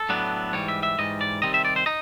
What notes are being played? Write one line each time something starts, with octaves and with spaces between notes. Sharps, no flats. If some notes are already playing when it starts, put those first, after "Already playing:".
Already playing: A4
A2 F#3 B3 D4
G#2 E3 G3 C#5
E5
E5
G#2 E3 G3 D#5
D5
C3 D#3 G3 C4 D#4 D#5
E5
D5
C5
D#4 D#5